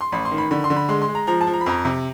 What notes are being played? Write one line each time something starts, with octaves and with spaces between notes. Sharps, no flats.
C6
A1 B5
C6
D#3
B5
D3 B5
C6
D3
B5
G#3 C6
C6
G#3
A#5
F3 A#5
A5
F3
A#5
B5
F2 A#5
C3